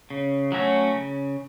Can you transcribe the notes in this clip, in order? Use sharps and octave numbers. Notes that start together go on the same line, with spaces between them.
C#3
F#3 A3 C#4 F#4
C#3